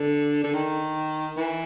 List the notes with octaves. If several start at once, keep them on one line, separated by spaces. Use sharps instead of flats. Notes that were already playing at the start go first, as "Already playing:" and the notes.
Already playing: D3
D3
D#3
E3